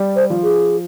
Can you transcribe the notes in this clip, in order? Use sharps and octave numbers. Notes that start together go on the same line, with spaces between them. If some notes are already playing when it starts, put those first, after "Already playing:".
Already playing: G3
C5
F3
G#4